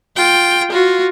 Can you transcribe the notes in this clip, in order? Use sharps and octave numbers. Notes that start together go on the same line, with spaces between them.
F4 G5
F4 F#4